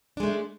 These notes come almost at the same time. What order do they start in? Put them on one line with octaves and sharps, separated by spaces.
D4 G#3 A3